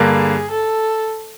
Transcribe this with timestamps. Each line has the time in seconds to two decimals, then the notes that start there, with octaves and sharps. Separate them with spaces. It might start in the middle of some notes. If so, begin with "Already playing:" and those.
Already playing: G2 D3 G3 A#3 G#4
0.50 A4